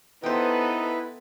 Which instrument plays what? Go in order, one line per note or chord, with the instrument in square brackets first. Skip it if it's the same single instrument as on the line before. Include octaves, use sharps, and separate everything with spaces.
[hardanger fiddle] B3 A4 [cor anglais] D#4 [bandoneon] E4 B4 [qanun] C5 G5